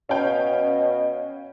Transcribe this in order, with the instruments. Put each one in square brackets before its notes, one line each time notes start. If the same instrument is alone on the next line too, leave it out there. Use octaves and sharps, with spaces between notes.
[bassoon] B2 [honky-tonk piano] C#4 F5 G5